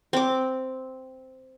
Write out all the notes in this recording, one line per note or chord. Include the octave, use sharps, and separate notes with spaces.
C4 D6